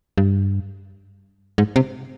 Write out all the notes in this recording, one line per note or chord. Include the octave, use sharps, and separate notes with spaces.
G2
G#2
C3